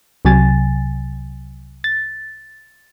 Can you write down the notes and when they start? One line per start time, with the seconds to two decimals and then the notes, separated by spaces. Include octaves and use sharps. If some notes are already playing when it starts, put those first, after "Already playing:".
0.25 C2 C3 F#3 G#5 A6
1.84 A6